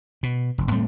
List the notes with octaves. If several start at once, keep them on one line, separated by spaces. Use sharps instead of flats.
B2
F1
A2 G3 A3 C4